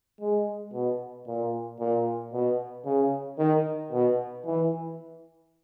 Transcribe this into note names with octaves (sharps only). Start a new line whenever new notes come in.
G#3
B2
A#2
A#2
B2
C#3
D#3
B2
E3